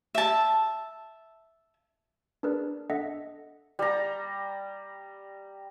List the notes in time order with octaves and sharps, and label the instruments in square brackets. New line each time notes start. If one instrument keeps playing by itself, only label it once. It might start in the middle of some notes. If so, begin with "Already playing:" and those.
[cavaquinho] E5 A5
[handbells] D4 G#4 A#4 B4 D5
D4 A4 D#5 E5 F#5 B6
[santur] G3 A#5